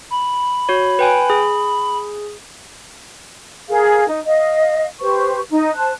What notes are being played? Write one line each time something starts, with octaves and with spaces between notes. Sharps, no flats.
B5
F#4 C#5
B4 G5 G#5
G#4
G#4 A#4 F5
D#4
D#5 F5
G4 B4 C5 C#6
D#4
C5 A5 F#6